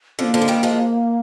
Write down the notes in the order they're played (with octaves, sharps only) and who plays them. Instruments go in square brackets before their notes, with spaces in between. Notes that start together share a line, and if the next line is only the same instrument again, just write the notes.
[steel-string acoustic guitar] D3 F3 [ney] C4
[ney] A#3
[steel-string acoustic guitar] D3 F3
G#3
D#3 G3
F3 G#3